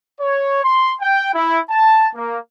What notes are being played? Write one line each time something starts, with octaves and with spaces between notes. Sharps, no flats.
C#5
C6
G5
E4
A5
A#3